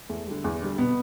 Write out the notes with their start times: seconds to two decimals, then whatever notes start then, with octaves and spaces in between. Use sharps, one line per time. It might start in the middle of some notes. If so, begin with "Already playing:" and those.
0.09 E2 A3
0.27 D3 G3
0.44 E2
0.62 D3 G3
0.78 B2 B3